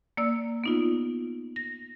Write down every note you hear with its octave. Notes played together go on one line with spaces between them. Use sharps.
A#3 D5 E6
B3 D#4 F4
A#6